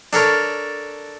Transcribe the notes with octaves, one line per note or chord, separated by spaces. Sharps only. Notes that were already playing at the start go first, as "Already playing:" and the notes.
D4 A4 A#4 C#5